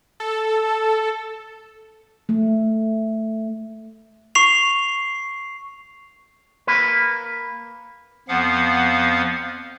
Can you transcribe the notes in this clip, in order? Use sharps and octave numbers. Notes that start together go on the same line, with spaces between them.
A4
A3
C#6 C7 F7
A#3 B4
F2 F3 B3 F5 F#5